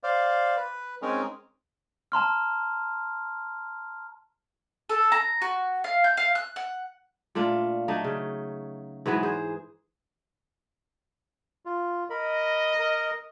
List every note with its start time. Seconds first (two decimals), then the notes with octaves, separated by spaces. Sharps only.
0.03 C5 D5 F5
0.57 B4
1.02 G#3 C4 C#4 D#4 G#4 A#4
2.12 A5 A#5 C6 F6
4.89 A4
5.12 A#5
5.42 F#4
5.84 F5
6.04 G6
6.17 F5
6.35 F#6
6.56 F#5
7.35 A#2 A3 D4 F4
7.88 F#3 A3 D4 D#4
8.04 C#3
9.06 G#2 E3 F#3 B3
9.23 G#4 C5
11.65 F4
12.10 A#4 D#5 B5
12.79 A#4